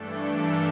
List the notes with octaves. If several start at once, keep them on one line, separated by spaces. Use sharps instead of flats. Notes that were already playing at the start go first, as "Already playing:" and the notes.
Already playing: G2 E3 A3 D4 A4
A#4